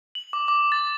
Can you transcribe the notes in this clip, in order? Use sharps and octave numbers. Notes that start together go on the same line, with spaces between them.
F#7
D6
D6
A6